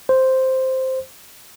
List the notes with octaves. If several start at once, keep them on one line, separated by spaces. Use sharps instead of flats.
C5